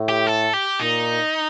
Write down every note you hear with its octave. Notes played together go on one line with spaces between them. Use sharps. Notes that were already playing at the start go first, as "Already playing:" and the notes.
Already playing: A2
G4
A4
G4
A#2 D#4